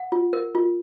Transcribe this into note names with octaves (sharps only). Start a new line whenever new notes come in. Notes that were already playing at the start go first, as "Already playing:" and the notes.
Already playing: F#5
F4
A#4
F4